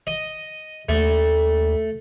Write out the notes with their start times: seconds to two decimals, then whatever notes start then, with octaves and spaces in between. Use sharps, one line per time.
0.07 D#5
0.89 D#2 A3